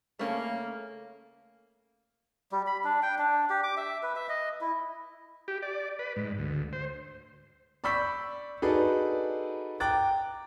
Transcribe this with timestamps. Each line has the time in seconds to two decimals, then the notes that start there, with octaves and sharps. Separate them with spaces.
0.19 C#3 A3 A#3 C#4
2.52 G3
2.67 B5
2.84 D4
3.03 G5
3.19 D4
3.50 G4
3.63 D6
3.77 E5
4.03 B4
4.16 E5
4.29 D#5
4.61 E4
5.48 G4
5.62 D5
5.99 B4
6.16 G#2
6.38 D2
6.73 C5
7.84 D5 B5 C#6 E6 G6 B6
8.62 D#4 F#4 G#4 A4 B4 D5
9.80 G5 A#5 D6 F#6 A6